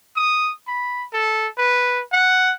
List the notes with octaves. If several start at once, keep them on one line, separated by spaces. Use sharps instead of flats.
D#6
B5
A4
B4
F#5